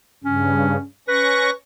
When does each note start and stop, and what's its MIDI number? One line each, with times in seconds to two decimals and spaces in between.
0.24 0.77 43
0.24 0.77 49
0.24 0.84 61
1.08 1.50 61
1.08 1.52 71
1.08 1.50 85
1.08 1.50 94